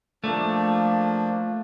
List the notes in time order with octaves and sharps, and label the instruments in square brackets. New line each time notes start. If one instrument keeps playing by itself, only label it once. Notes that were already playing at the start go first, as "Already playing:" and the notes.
[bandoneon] F3 A#3 D4 [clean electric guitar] A3